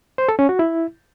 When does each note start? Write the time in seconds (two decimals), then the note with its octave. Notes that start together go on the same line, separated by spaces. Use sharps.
0.18 C5
0.29 A4
0.39 C#4
0.49 F#4
0.59 E4